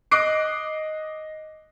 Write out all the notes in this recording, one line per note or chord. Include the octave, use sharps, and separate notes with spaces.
D#5 D6 D#6 F#6 C7 D7